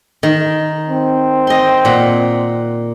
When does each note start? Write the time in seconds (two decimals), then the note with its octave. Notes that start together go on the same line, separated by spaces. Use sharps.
0.23 D#3
0.89 C4
1.47 D#5 C6
1.85 A#2 F#5